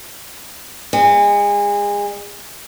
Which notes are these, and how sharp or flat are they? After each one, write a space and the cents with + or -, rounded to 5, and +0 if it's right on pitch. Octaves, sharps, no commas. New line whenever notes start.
G#3 -30